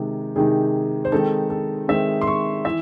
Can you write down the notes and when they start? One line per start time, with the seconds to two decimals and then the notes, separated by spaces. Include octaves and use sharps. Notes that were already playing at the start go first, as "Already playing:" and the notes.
Already playing: C3 D#3 G#3 D#4
0.36 C3 D#3 G#3 D#4 G#4
1.05 C5
1.12 D#3 G#3 C4 D#4 A4
1.50 A4
1.88 D#3 G#3 C4 D#4 E5
2.21 C6
2.27 C#6
2.65 E3 E5